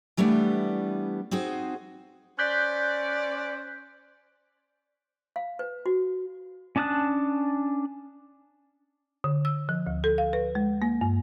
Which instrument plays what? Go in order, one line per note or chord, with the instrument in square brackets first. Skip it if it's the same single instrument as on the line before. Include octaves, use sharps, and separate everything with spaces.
[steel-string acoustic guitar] E3 G3 A3 B3 D4 E4
C4 D#4 F#4 G#4 C5
[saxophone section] C#4 C5 D5 [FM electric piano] F#6 G6 B6
[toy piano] F5
B4
F#4
[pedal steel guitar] C#4 D4 A5 D#6 F#6
[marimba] D3
E6
F3
D2
A4
F5
B4
G#3
A#3
G2